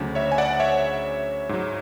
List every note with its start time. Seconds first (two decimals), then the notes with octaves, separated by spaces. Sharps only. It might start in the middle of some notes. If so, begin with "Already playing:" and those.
Already playing: D2 C#3 F#3
0.15 C#5 E5
0.32 G#5
0.38 D5 F#5
0.60 C#5 E5
1.49 G#2 F#3